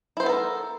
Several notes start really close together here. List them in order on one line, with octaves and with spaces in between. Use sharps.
E4 C5 B3 A4 A#4